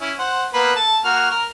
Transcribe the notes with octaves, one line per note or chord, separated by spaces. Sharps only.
C#4 E4
C5 F#5
A#3 B3 B4
A4 A5
A#3 F#4 F6
A#4 F6